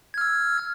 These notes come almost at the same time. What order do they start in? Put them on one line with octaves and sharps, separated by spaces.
G#6 F6 E6